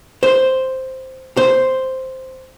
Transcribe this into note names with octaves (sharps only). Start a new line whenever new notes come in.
C5
C5